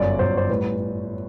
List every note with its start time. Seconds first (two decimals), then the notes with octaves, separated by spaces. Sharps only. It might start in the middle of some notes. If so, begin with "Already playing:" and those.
Already playing: G1 F#2 F#3 D5
0.19 G1 F#2 F#3 C5
0.37 C5
0.49 A2 G3 B4